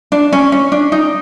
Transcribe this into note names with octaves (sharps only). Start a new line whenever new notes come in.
D4
C#4
C#4
D4
D#4